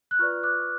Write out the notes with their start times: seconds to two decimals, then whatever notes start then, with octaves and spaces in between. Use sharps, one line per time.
0.11 F#6
0.19 F4 B4 D5 C#6 F6
0.43 D6 F#6